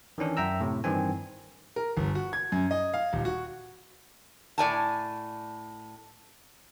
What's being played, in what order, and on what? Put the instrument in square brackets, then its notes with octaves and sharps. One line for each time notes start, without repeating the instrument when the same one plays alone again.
[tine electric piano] D#3 E3 C#4 D4
F#2 E5 G5 A#5 E6
A2 C3
G2 D#3 E3 C4 G#5
[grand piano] A#4
G1
F#4
G#6
F#2
D#5
F5
D#1
F#4
[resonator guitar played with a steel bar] A2 D5 G#5 A5